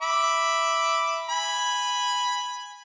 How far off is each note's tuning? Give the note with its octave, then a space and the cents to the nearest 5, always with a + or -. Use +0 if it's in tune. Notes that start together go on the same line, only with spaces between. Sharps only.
E5 +0 B5 +0 D6 +0
G#5 -10 B5 +0